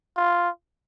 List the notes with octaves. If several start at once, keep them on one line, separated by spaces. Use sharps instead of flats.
F4